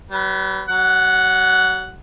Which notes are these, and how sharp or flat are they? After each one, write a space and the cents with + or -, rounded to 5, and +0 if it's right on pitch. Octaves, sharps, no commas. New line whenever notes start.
G3 -45 B4 +0
F#3 +40 F#5 +0